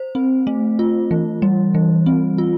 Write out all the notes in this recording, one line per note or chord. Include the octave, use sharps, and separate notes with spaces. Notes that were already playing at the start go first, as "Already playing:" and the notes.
Already playing: C5
C4
A3
F4
E3
G3
E3
C4
F4